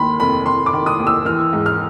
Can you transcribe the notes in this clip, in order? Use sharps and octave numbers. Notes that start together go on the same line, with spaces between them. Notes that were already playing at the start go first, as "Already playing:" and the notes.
Already playing: D#2 D#3 B5 C6
F1 B5
F1 C6
D6
D#3
D#6
D#2
E6
E3 F6
G#2
F6